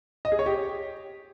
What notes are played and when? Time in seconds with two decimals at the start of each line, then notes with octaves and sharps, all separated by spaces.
0.25 D#5
0.32 G#4
0.39 C#5
0.46 G4